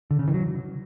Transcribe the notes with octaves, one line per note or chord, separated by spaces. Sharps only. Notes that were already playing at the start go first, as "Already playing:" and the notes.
D3
C#3
E3
F#3